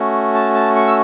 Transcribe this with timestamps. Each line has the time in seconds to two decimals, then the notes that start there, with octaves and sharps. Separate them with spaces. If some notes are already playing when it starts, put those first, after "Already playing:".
Already playing: A3 C#4 F#4
0.34 A5
0.55 A5
0.76 C#6
0.87 E6